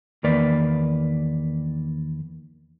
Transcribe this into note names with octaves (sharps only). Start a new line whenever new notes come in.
E2 D#3 A#3 B4 D5